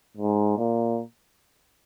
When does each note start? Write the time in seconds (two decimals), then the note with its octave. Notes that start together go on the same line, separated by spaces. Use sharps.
0.17 G#2
0.58 A#2